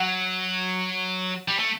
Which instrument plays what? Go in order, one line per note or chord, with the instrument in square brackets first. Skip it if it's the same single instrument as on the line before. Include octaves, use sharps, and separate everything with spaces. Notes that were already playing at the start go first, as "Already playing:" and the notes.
Already playing: [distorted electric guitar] F#3 [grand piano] F#5
[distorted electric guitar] G3
A3